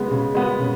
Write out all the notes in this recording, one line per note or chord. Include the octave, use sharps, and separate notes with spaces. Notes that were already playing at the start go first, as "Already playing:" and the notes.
Already playing: C#3 G#3 B3
C#3
G#3 B3
C#3